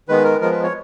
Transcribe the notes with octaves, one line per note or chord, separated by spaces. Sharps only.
D#3 G#3 B3 B4
A#4
F3 G#3 B3 A#4
B4
C#5